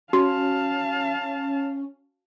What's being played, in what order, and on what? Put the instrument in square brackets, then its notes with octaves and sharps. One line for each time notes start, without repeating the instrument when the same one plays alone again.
[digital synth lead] C#4 [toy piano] F#4 [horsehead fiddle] F5 A5